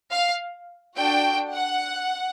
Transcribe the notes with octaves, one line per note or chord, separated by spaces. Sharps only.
F5
D4 F#4 A4 G5
F#5